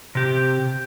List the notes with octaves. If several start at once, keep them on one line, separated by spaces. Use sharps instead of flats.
C3 G4